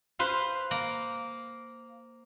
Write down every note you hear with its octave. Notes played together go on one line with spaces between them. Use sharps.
B4 C5 F5
A#3